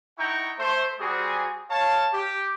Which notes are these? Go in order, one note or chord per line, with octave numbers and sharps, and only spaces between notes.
D#4 E4 F#5 G5 A#5 C#6
A3 C5
G3 C4 F#4 G#4
C#5 F5 A5
G4